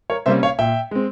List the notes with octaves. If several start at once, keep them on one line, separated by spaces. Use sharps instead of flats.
A#4 C#5
C3 G3 A#3 C#4 C5 E5
C#5 F5
A#2 E5 G5
G#3 C4